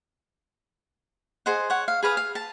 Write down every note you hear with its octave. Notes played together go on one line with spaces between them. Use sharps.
G#4 C5 D#5 F#5
C#5 F#5
F5
G#4 B4 F5 D#6
F5
A5